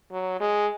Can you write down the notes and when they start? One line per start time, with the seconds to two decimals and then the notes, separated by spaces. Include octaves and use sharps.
0.12 F#3
0.40 G#3